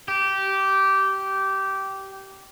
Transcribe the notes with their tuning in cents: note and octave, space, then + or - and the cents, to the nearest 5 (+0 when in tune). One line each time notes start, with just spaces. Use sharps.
G4 -15